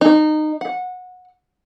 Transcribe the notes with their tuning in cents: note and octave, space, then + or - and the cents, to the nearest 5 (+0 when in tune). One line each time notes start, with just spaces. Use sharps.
D#4 -20
F#5 -20